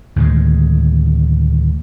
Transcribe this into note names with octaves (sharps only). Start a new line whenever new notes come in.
D2 A2 D#3 G#3